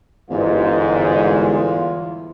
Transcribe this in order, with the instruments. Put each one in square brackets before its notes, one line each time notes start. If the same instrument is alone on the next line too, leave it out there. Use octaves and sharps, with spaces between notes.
[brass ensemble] G1 G#2 [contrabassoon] E2 [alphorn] F4